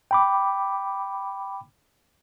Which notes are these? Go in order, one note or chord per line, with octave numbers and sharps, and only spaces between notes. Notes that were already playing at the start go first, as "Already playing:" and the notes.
G5 B5 D6